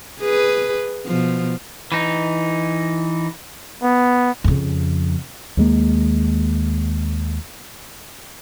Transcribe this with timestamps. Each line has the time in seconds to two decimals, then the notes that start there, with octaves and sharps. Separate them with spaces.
0.21 G#4 B4
1.06 B2 F3
1.92 E3 D#4
3.82 B3
4.44 F2 C#3
5.57 D#2 G#3 A#3